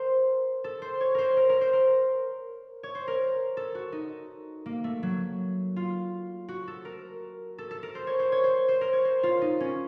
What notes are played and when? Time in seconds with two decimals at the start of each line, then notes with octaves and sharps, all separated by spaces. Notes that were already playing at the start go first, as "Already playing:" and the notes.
Already playing: A#4 C5
0.64 A4
0.82 C5
1.01 C#5
1.15 A#4 C5
1.37 A#4
1.49 A#4
1.61 C5
1.73 A#4
2.83 C#5
2.95 C5
3.08 A#4
3.57 A4
3.75 F#4
3.92 D#4
4.66 A#3
4.84 A3
5.03 F#3
5.76 F4
6.49 F#4
6.68 A4
6.85 A#4
7.58 A4
7.71 A4
7.83 A#4
7.95 C5
8.07 C#5
8.19 C5
8.32 C#5
8.44 C5
8.68 C5
8.81 A#4
8.93 C#5
9.05 C5
9.23 F4
9.42 D#4
9.60 C#4